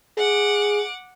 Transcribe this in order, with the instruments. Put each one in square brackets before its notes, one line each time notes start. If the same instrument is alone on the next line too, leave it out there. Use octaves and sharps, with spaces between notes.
[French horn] G#4 [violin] F#5 D6